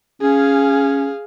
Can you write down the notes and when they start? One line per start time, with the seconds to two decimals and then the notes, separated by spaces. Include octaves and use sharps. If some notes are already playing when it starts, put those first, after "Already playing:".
0.22 C#4 G#4 F5